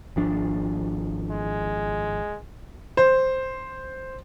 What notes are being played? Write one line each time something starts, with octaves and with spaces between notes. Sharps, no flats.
G#1 F3 D4
G#3
C5